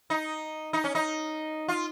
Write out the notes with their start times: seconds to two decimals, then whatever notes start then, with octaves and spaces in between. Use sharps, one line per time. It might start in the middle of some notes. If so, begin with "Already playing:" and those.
0.10 D#4
0.73 D#4
0.84 C#4
0.95 D#4
1.68 F4